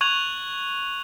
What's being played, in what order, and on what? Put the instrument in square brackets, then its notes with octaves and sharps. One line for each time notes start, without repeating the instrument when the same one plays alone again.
[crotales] C#6 F#6 G#6 F7 F#7